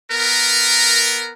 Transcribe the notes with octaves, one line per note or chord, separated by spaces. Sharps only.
B3 A#4